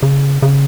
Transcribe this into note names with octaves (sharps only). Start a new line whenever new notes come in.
C#3
C#3